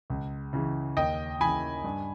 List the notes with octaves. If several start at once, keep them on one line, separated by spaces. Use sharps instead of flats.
C#2
C#3 E3
D#2 D#5 G5
C#3 E3 G#5 B5
G2